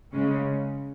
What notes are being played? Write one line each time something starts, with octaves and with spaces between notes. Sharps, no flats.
C#3 G#3 C#4